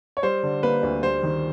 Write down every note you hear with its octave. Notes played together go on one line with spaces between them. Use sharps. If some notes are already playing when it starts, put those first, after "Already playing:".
C#5
G3 C5
D3
A#3 B4
D2
G3 C5
D#3